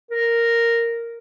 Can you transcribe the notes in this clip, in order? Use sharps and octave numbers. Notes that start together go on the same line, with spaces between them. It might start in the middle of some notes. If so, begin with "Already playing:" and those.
A#4